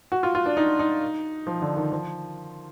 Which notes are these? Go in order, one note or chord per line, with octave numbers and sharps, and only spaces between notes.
F#4
F4
F4
D4
D#4
D#4
F3
D3
D#3
F3